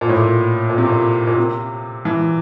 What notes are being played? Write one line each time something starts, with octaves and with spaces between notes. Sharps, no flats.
A#2
A2
A#2
A#2
C3
A#2
A#2
C3
E3